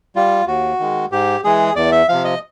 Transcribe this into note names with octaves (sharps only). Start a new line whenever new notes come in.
G3 F4
D#2 F#4
D#3 G#3
G#2 G4
E3 G#3 G#4
E2 D5
E5
C3 F3 F5
D#5